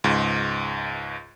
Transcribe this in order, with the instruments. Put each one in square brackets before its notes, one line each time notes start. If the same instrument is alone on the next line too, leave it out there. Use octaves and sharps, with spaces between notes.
[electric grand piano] C#2 G#2